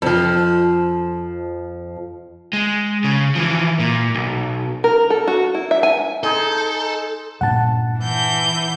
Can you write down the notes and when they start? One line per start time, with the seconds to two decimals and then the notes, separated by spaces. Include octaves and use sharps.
0.02 F2 F3
2.53 G#3
3.04 C#3
3.35 E3 F3
3.80 A#2
4.15 B1
4.84 A#4
5.10 A4
5.27 F#4
5.55 E4
5.71 E5
5.83 G#5
6.23 D#4 G#4 A4 C5
7.41 G2 A#2 D4 F#5 A5
8.00 E3 G6